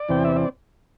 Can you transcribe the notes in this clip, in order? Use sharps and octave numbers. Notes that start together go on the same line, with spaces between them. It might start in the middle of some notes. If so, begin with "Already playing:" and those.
Already playing: D5
E2 C3 E3 C4 G5
E5
D5